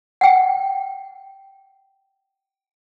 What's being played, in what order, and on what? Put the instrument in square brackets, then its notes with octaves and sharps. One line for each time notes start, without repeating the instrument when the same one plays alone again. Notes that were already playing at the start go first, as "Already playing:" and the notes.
[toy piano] F#5 G5